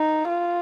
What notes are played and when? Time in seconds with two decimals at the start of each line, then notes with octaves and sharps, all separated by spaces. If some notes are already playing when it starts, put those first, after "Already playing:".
Already playing: D#4
0.29 F4